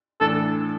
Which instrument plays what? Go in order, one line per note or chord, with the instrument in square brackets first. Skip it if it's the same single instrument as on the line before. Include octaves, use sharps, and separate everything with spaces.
[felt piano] A2 E3 D4 [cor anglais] A4